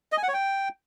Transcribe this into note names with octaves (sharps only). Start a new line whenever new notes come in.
D#5
G#5
F#5
C#5
G5